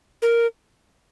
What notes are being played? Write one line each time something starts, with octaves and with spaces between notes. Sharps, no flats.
A#4